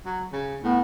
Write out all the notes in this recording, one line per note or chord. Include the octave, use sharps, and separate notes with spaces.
F#3
C#3
A2 B3